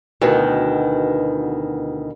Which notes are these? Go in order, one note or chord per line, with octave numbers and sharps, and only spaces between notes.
D2 B2 D#3 E4 B4